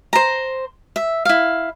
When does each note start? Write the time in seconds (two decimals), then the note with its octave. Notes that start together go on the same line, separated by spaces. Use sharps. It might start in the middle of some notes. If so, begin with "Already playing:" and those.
0.13 C5 A#5
0.96 E5
1.25 E4 F5